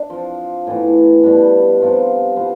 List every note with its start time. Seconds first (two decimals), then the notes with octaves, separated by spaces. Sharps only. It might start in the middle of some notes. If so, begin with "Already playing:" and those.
Already playing: D4
0.10 F3 C4 F4 C5
0.67 A2 E3 B3
1.23 B2 G3 D4
1.80 C3 F3 B3 F4
2.36 B2 B3 F4 C5